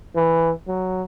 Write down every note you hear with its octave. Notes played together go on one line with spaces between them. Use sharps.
E3
F#3